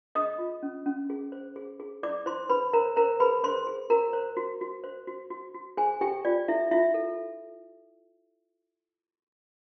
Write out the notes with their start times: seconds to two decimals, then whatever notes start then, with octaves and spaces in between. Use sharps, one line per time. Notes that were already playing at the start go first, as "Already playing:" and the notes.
0.15 G#4 D#5 D#6
0.38 F4
0.63 C#4
0.86 C#4
1.10 G#4
1.32 C5
1.56 G#4
1.80 G#4
2.03 E4 D5 D6
2.26 E4 C5 C6
2.49 G#4 B4 B5
2.73 A#4 C5 A#5
2.96 A#4 C5 A#5
3.20 G#4 B4 B5
3.43 G#4 C5 C6
3.67 G#4
3.90 F#4 A#4 A#5
4.13 C5
4.37 F#4
4.61 F#4
4.84 C5
5.07 F#4
5.30 F#4
5.54 F#4
5.77 G#4 C5 G#5
6.01 G4 A4 G5
6.25 F4 D5
6.48 E4 A4 E5
6.71 E4 F4 E5
6.94 A4